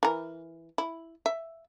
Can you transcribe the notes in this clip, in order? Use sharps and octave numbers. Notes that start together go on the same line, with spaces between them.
E3 A#4
E4
E5